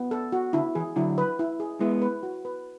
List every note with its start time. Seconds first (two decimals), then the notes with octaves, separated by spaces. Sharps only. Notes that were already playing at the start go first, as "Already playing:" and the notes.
Already playing: B3
0.11 A4
0.32 F#4
0.53 D3 E4
0.75 E3 G#4
0.96 D3 F#3 E4
1.18 B4
1.39 E4
1.60 G#4
1.80 G#3 B3 E4
2.02 B4
2.23 F#4
2.45 B4